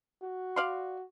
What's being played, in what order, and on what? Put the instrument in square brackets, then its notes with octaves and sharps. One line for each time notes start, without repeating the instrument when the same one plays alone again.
[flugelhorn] F#4
[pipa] D5 F5 C6